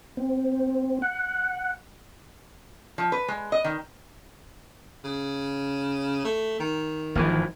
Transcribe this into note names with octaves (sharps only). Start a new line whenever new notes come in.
C4
F#5
F3
B4
G#3
D#5
D#3
C#3
A3
D#3
G#1 E3 F3